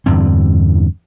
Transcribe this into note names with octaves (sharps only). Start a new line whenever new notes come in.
E2 G2 D3 C4